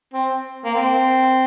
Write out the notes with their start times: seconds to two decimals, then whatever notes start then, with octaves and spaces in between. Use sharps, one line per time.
0.14 C4
0.64 A#3
0.75 C4